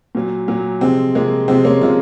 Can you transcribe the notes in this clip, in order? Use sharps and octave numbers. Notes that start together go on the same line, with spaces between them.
A#2 F#3
A#2 F#3
C3 F3 G#3 C4
C3 F3 G#3 A#3
C3 F3 G#3 C4
A#3 C#4
C3 F3 G#3 C#4 F4